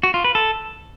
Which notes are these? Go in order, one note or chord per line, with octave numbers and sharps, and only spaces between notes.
F#4
F4
B4
A4